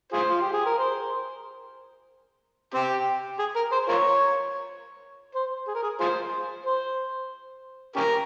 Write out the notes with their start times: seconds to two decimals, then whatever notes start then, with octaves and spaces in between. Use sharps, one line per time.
0.13 F4 G#4 C5
0.29 F4
0.41 G4
0.53 G#4
0.66 A#4
0.78 C5
2.74 C4 G4
3.39 G#4
3.56 A#4
3.72 C5
3.89 F4 A#4 C#5
5.35 C5
5.67 G#4
5.75 A#4
5.82 G#4
6.00 F4 G#4 C5
6.66 C5
7.96 C#4 G4 A#4